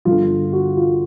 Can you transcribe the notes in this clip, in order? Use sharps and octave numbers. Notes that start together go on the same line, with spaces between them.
G1 G2 D3 F4
F#4
F4